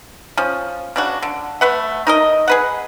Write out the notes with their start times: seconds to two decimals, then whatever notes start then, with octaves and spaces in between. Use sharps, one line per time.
0.37 F3 C#4
0.96 C#3 D4 F#4
1.22 D3
1.61 A3 B4 F#5
2.07 D#4 A#4 D#5
2.48 G#4 B4 F#5